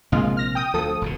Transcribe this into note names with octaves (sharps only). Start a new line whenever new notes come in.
A#1 C3 G#3 A#3 F4
F6 A#6
G5 D#6
D2 F3 A4 D#6
E1 B2 D3